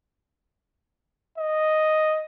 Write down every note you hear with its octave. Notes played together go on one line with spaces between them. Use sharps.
D#5